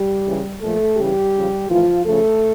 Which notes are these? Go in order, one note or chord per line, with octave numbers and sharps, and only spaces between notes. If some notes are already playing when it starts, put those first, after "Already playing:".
Already playing: G3 G4
C#3 E3
A#2 F3 A3 A4
C#3 E3 G3 G4
C#3 F3
A2 E3 F3 F4
C#3 F3 A3 A4